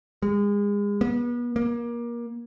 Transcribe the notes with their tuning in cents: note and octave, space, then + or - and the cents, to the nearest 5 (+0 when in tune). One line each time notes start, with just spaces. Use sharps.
G#3 -30
B3 -35
A#3 +25